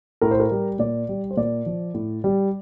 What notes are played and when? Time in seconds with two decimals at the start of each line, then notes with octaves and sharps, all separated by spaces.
0.21 A2 A#4
0.31 C5
0.40 A#4
0.51 G3
0.79 A#2 D5
1.09 G3
1.31 C5
1.37 A#2 D5
1.66 F3
1.94 A2
2.24 G3